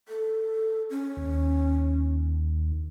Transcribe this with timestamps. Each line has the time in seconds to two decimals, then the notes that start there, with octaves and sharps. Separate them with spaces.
0.08 A4
0.90 C#4
1.17 D#2